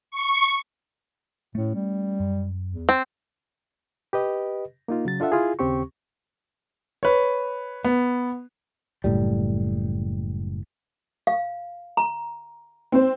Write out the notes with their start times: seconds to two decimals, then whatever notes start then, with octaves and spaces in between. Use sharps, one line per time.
0.11 C#6
1.55 A2 A3 C#4
1.75 G3
2.20 F#2
2.71 E2
2.89 C4
4.13 G4 B4 D#5
4.88 A#3 D#4 F4
5.05 C#3 F#3 A6
5.20 D4 F4 A4 E5 F#5
5.32 E4 F4 G#4
5.59 D#2 C#3 C4 G4 C#6
7.03 B4 C#5
7.84 B3
9.04 F#1 A2 G3
11.27 F5
11.97 A#5
12.92 C4 C5